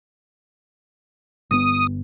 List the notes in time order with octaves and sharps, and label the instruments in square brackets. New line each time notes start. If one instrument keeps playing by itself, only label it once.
[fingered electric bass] G1 B3 [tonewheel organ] D#6